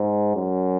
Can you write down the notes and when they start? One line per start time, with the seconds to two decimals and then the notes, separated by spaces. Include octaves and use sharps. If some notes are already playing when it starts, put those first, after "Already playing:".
Already playing: G#2
0.36 F#2